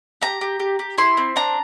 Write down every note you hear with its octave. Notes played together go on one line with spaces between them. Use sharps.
G4 A#5
G4
G4
G4
E4 C6
C4
D4 A#5